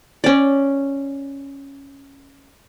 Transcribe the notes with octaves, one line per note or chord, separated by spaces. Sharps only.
C#4 D5